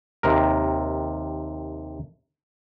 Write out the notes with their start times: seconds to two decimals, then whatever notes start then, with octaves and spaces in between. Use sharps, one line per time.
0.23 D#2 C3 A#4